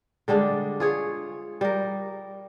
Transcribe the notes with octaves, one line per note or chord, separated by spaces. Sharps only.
D3 G3 G#3 D4
F4 G#4 C#5
G3 A#4